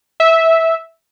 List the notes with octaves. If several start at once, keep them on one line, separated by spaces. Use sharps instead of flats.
E5